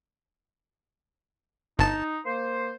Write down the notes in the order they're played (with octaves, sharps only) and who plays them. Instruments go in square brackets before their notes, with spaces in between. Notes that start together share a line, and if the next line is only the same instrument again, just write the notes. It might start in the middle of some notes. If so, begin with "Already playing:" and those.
[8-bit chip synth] G1 A5 [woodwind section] D#4
[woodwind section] A#3 C5